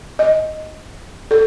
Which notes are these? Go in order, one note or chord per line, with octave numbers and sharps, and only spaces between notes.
D#5
A4